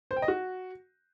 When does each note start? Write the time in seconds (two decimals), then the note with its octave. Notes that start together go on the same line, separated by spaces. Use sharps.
0.11 C5
0.16 G5
0.22 D#5
0.28 F#4